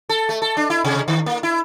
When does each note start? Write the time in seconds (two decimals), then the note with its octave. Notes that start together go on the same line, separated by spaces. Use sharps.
0.09 A4
0.29 A3
0.42 A4
0.57 D4
0.70 E4
0.85 C3
1.08 D#3
1.26 A#3
1.43 E4